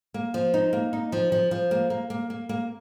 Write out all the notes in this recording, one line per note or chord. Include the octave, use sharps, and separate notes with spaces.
A#3
F3
D#4
A#3
D#4
F3
F3
F3
A#3
A#3
A#3
A#3
A#3